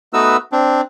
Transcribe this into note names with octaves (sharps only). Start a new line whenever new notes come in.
A3 B3 D#4 F#4 B4 E6
C4 D4